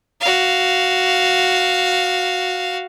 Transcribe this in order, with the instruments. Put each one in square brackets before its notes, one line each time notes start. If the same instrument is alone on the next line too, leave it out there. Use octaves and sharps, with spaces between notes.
[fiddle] F#4 F5